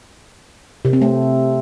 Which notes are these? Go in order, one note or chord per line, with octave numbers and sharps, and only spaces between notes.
C3
C4
A3